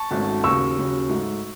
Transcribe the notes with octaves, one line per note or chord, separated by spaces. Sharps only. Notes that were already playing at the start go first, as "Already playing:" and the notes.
Already playing: A5 C#6
G#1 G#2 F#3 A3 C#4
D#2 C#3 F#3 C#6 E6
D#2 C#3 F#3
G#2 F#3 A3